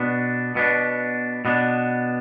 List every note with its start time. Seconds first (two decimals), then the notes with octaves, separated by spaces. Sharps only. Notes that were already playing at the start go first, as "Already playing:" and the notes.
Already playing: B2 B3 D4
0.55 B2 B3 D4
1.45 B2 B3 D4